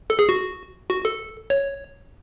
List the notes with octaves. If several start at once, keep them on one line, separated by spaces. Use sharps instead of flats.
A4
G#4
F#4
F#4
A4
C#5